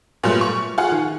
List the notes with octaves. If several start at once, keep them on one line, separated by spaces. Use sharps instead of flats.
A#2 F#3 G3 A3 B3
C#6
F4 G#4 F#5
D#3